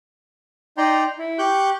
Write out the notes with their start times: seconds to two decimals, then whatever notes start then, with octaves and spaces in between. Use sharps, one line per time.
0.77 D#4 D5 G5 A#5 C6
1.19 E4
1.39 G4 C#6 F#6 G6